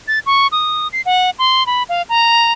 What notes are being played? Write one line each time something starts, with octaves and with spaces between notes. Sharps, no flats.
A6
C#6
D#6
C7
F#5
C6
B5
F5
A#5